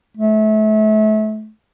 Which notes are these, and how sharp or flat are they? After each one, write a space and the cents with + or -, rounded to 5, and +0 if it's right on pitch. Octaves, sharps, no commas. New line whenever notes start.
A3 -30